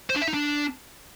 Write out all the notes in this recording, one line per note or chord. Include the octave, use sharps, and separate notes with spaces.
C5
D4
E5
D#4
D4